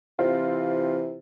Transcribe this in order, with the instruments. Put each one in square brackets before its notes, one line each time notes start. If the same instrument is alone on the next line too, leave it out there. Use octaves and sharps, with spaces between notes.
[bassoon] C3 [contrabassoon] E3 [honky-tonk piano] C4 F4